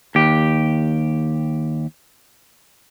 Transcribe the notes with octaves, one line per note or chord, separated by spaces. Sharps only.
D#2 G4